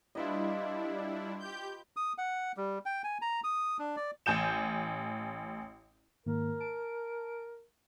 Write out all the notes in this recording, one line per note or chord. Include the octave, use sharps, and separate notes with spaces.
G3 D4 E4 F4 B4 D#5
G4 G6
D#6
F#5
G3
G5
G#5
A#5
D#6
D4
D5
A1 G#5 G6 E7
G#2 D#3 A#3 A#4
A5 D7